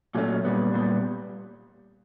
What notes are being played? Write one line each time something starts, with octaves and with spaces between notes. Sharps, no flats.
A#2 F#3 A3 C#4
A#2 G3 B3
A#2 G3 B3